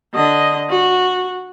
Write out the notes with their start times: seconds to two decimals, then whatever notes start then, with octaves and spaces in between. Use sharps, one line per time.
0.14 D3 D#5
0.70 F#4